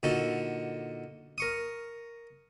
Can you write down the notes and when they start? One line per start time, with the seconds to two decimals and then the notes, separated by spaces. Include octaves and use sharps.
0.03 A#2 D3 D#4 F#4 A4
1.38 A#4 C#6 D#6